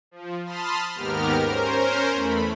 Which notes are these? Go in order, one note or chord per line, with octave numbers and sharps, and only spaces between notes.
F3
A5 B5 C6 D#6 F6
D#2 G#2 B3 G4 A#4 F6
C#4 A#4 C5
E2 A3 B5